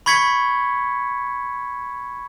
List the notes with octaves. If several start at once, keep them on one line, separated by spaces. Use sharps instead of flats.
B5 C#6 G#6 B6 C#7